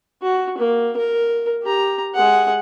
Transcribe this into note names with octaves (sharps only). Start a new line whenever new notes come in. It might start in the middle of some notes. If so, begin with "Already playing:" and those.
F#4
A#3
A#4
G4 A#5
G#3 F#5